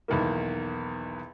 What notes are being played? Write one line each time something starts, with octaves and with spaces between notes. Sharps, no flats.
B1 E2 D#3 A#3